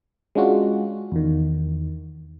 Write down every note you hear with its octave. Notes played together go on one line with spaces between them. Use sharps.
G#3 C#4 D4 F4 F#4
E2 D#3